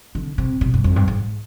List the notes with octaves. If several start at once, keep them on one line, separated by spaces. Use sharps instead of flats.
D3
C3
B2
G2
F2
G2
G#2